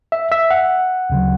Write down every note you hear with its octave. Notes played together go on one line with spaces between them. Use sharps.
E5
E5
F#5
D2 C#3 F#3